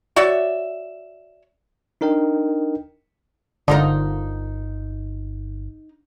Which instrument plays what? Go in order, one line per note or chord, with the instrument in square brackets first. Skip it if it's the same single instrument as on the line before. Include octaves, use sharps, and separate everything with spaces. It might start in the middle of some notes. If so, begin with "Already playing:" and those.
[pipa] F#4 C#5 D5 E5
[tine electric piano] D4 D#4 A#4 D#5 G5
[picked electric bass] G1 [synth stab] D3 [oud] D#4 F4 A#4